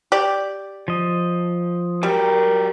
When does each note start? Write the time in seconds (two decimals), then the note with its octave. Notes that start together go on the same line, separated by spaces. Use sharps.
0.12 G4 D5
0.88 F3 D#5
2.03 F#3 G3 G4 A#4